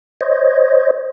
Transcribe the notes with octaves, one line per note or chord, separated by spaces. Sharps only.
C5 C#5 D#5